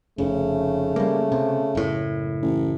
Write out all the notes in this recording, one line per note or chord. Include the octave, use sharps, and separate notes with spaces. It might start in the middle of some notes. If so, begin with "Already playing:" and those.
F1 C#3 A3
G3 A#3
C3
F#1 A2
A1